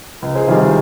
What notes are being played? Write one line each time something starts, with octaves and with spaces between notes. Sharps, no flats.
C#2
G#4 C5
C3 D#3 G3 F4 G#4